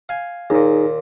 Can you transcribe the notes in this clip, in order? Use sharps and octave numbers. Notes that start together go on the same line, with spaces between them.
F5 G#5
D#2 A#2 D#4 G#4